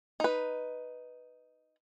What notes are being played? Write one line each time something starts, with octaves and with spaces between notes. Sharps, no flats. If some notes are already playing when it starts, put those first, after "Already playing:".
D#4 B4